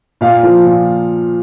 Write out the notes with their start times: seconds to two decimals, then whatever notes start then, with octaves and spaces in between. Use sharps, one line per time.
0.21 A#2 F5
0.43 F3
0.66 A#2